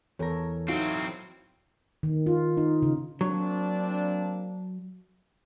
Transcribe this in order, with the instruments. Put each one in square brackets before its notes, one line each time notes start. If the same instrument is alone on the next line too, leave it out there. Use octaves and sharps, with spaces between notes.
[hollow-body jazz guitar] E2 A#4 [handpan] E3 A4 C#5
[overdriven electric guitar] F#3 C4 [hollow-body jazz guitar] D#4 F#4 F5 [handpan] E4
[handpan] D#3
F4
D#4
C#3
[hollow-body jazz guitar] F#3 [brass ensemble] A#3 C4 D4